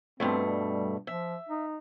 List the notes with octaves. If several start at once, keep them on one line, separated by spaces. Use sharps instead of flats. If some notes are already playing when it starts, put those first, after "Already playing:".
G2 B2 A3 C4
G3
F3 E5
D#4